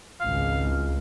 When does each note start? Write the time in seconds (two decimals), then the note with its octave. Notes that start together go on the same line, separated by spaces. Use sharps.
0.21 G#1 C#2 F5